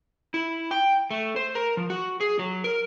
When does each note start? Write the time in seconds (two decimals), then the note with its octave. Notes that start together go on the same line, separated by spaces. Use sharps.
0.34 E4
0.71 G5
1.11 A3
1.36 C5
1.55 A#4
1.77 F3
1.90 F#4
2.20 G#4
2.39 F#3
2.64 A#4